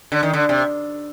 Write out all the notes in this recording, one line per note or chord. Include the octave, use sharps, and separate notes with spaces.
D3
D#3
D3
C3